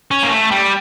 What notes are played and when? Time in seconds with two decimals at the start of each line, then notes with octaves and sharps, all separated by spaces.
0.11 C#4
0.23 A#3
0.30 A3
0.51 G3